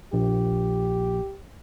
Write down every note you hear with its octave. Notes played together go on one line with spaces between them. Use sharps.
A#1 G4